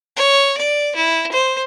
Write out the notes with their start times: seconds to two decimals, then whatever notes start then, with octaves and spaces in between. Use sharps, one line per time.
0.16 C#5
0.57 D5
0.96 E4
1.32 C5